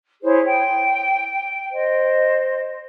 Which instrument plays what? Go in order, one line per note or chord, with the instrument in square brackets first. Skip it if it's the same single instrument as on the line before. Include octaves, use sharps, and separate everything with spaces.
[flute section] E4 G#4 C5 C#5
G5
C5 D#5